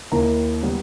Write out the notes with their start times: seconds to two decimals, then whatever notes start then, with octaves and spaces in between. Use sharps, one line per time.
0.12 D#2 D#3 A#3 E4 A#5
0.63 G3 B3